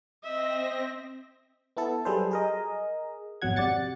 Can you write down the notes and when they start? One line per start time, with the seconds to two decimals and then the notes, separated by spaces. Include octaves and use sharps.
0.23 C4 D#5 E5 A#6
1.77 B3 E4 A4
2.05 F#3 G3 G#4 A4 B4 C5
2.31 G#4 A#4 D#5
3.42 G#1 F2 B2 F#3 F#5 G#6
3.56 C3 D5 F#5 A6 C#7